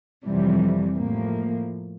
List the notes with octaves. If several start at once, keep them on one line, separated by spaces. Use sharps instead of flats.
F2 C3 E3 G3
A2 F3 A#3